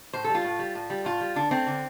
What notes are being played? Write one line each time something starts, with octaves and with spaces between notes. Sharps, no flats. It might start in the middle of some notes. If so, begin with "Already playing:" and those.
A2 C5
A4
G3
F4
A2
G3
A2
G3
A2 F4
G3
D3 D4
A3 C4
D3